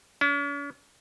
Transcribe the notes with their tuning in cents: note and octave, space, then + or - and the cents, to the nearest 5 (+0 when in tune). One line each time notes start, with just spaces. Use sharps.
C#4 +45